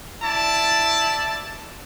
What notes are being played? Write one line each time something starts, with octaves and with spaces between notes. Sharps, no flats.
E4 D5 A5